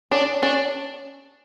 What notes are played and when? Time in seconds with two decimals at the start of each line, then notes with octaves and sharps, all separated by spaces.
0.11 C#4 D4
0.43 C#4 D4